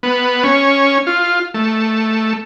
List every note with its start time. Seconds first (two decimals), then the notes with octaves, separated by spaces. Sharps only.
0.03 B3
0.44 C#4
1.07 F4
1.54 A3